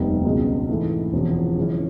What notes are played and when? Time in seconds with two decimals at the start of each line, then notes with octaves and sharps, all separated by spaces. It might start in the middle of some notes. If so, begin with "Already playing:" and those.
Already playing: F1 D#2 D#3 G3 B3
0.25 C#2 B2 G#3
0.69 G#2 E3 A3
1.12 E1 E2 C3 F3
1.57 F#2 C#3 E3 G#3 C#4